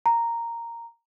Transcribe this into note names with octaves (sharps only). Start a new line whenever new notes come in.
A#5